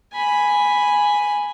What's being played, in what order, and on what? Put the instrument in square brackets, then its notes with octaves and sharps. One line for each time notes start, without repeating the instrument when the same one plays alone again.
[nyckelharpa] G#5 B5